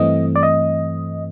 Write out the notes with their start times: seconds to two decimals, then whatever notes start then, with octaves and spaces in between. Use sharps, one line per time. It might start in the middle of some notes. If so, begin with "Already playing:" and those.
Already playing: G2 E3 A3 C4 D#5
0.36 D5
0.43 D#5